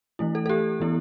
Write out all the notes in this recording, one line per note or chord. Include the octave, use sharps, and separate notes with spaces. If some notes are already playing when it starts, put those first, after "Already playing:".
E3 A3 E4
A4
A4
G4
E3 B3 E4